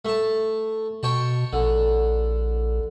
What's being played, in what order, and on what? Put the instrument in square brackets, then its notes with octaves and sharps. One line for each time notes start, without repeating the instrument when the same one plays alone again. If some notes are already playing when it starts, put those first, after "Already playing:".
[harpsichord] A3 A5
[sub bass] B2 [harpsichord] C#5 G5 A5
[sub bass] A#1 [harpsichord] D3